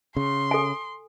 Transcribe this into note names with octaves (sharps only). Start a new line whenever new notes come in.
C#3 C6
A4 G#5